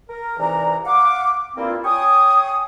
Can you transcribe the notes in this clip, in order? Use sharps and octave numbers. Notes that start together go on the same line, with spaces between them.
A#4
C2 G#2 E3 D5 A#5
F5 F#5 D6
G2 A#3 C4 E4 F4
C#5 G5 G#5 C#6 D#6